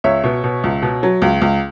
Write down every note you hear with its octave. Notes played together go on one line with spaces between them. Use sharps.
C#2 C#5 E5
B2
B2
C#2
B2
F#3
C#2
C#2